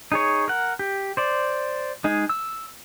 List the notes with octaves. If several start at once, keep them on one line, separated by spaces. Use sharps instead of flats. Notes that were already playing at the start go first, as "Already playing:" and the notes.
D#4 G#4 C#5
A#4 F#5
G4
C5 D5
G#3 D#4 G#4
E6